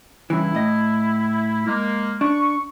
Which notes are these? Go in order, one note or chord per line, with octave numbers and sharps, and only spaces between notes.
G2 C#3 E3 E4
A2 D#5
G#3 A#3
D4 C#6